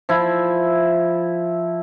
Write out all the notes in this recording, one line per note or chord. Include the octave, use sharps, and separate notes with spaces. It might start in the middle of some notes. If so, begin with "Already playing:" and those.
F3 E4